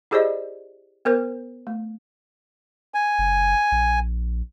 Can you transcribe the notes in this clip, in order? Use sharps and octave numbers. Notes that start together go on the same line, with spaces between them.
E4 G4 G#4 C5 D5 D#5
B3 A#4 C5
A3
G#5
F#1
A#1